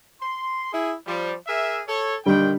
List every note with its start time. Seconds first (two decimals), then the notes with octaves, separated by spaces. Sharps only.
0.20 C6
0.72 E4 G#4
1.06 F3 G3
1.47 G#4 A#4 E5
1.88 A4 C#5
2.26 A#2 D3 D#3 G3 G5